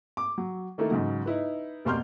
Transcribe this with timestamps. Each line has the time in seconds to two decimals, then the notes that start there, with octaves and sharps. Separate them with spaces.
0.17 D6
0.38 F#3
0.78 D#3 A3 A#3 E4 A4
0.91 G#2 C#3 F#3
1.26 D#4 E4 B4
1.85 F1 B2 A#3 C6 F6 G6